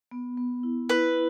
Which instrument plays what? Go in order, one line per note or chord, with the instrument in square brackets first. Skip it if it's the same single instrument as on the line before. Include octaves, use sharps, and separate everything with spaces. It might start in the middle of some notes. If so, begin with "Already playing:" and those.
[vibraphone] B3
B3
E4
[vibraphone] E4 [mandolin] B4